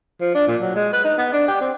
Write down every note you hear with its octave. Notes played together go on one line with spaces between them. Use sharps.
F3
D4
A#2
F#3
G#3
B4
D#4
B3
D4
G4
C4